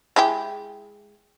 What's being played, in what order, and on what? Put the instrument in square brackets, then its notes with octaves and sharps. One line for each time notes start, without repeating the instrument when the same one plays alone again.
[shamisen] G#3 E4 G4